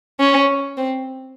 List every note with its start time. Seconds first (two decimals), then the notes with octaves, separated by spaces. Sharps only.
0.20 C#4
0.77 C4